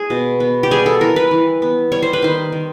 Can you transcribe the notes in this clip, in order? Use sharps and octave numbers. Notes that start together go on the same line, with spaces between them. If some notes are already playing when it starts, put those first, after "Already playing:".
Already playing: G#3 G#4
B2
B3
G4
G3 G#4
A4
E3 A#4
B4
E3
B3
G3 C#5
C5
B4
D#3 C5
D#3